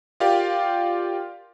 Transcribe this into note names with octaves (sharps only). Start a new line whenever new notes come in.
F4 G4 A#4 D5 F5 G5